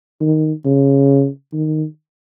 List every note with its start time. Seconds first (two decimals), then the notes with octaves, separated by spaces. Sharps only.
0.21 D#3
0.65 C#3
1.53 D#3